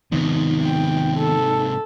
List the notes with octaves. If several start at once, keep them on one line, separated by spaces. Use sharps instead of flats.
G#2 C3 D#3 F3 B3 D#4
G5
A4